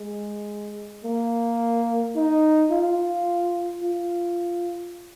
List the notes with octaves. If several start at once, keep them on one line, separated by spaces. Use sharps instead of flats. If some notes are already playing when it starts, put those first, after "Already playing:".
Already playing: G#3
A#3
D#4
F4
F4